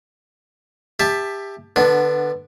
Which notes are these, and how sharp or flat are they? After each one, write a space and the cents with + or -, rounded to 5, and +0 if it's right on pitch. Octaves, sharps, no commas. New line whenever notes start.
G4 +20 E5 +0 A5 +0
D3 +25 B3 +0 D4 +0